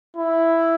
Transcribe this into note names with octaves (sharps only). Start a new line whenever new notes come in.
E4